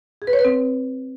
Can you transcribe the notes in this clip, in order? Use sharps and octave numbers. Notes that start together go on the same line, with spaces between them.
G#4
B4
C#5
B4
C4